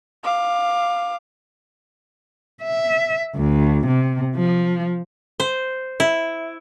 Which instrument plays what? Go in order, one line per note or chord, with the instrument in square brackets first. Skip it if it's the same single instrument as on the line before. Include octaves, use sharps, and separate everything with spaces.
[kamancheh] F5 D6
[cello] E5
D2
C3
F3
[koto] C5
E4